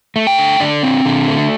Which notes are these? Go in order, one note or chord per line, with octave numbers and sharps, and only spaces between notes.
A3
G5
D3
D3 D5
C4
D3
A3